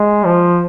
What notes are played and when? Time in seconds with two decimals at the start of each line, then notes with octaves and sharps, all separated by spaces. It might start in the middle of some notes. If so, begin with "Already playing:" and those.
Already playing: G#3
0.25 F3